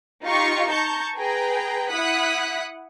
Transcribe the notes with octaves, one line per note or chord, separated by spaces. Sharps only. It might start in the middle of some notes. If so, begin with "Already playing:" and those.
D#4 F4 G4 D#5 C#6
A5 A#5 C#6 G6
G#4 B4 G5 A#5
E4 F#5 D#6 F#6 B6